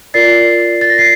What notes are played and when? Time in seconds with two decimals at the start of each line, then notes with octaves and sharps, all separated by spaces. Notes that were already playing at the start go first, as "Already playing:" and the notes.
0.14 F4 A#4 D5 A6 C7
0.81 A6
0.89 A#6
0.98 A6 C7